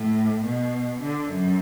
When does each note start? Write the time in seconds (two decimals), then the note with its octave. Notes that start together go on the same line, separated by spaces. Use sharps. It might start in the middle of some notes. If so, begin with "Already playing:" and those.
Already playing: A2
0.45 B2
1.02 D3
1.31 F#2